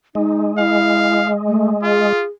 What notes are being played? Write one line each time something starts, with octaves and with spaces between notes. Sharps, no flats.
G#3 D#4
E4 F5
A3
F4 G#4